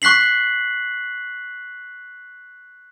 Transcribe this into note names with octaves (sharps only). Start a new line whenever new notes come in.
C#6 F#6 B6 C7 F#7